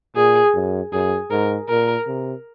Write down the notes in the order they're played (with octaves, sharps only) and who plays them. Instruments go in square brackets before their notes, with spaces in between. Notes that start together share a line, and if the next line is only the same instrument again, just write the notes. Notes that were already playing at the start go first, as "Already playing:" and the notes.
[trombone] A#2 [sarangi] G#4
[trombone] F#2
[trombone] F#2 [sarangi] G#4
[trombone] G#2 [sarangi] A#4
[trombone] A#2 [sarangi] A#4
[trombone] C3